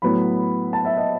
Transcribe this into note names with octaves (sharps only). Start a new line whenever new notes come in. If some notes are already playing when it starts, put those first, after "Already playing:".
A2 F#3 B3 B5
A5
E5
D#5